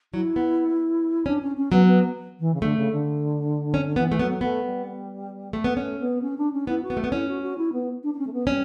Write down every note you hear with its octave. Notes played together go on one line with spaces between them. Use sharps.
F#3 E4
B3
C#4 D4
C#4
C#4
F#3 B3
B3
E3
C#3
D3 A3
C#3
D3
C#4
E3 B3
E3 A3
F#3 B3
A3 B3
G3
A3
B3
A3 C#4
B3
C#4
D4
C#4
B3 E4
F#4
B3
A3
B3
C#4 E4
F#4
F#4
E4
B3
D4
D4
C#4
A3
B3
G3 C#4